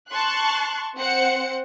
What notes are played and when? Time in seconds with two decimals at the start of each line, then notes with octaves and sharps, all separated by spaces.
0.11 A5 C6 C#6 F#6
0.97 C4 C5 F#5 C#7